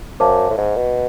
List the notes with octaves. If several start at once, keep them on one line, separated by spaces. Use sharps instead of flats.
F#2 C5 F5 A5 D6
A2
G#2
B2